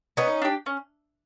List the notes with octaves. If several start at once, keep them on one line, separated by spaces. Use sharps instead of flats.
B3 C#4 D#4
D4 G4
C#4